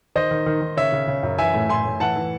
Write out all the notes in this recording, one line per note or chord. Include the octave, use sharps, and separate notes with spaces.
D#3 C5 D#5
D#3
D#3
D#3
C#3 C#5 E5
C#3
C#3
F#2
E3 E5 G#5
A2
A2 G#5 C6
A2
E3 F#5 A5
E3